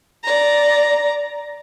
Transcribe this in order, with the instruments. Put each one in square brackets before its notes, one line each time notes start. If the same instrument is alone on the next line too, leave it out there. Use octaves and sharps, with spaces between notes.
[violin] D5 A#5